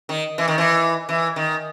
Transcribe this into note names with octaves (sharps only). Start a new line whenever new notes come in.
D#3
E3
D#3
E3
E3
D#3